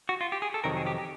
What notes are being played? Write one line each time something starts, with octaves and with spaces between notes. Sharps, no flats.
F#4
F4
G4
G#4
A4
F2 C3 D#3 F#3 A#4
G#4
G4
G4